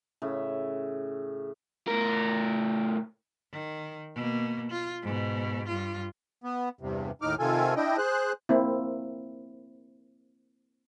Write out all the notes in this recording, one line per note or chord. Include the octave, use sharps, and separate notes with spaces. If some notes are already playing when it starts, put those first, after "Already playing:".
A2 C#3 E5
A2 A#4
D#3
B2 A#3
F4
G#2 B2
G2 F4
B3
E2 G2 C3
D#2 A2 D#4 D6 F6
C3 D#3 F4 A4 G#5
D4 E4 D#5 G5
G#4 C5 F#6
A#3 C4 E4